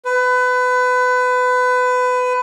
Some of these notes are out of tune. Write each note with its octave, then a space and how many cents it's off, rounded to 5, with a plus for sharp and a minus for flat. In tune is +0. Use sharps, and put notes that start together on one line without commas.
B4 +25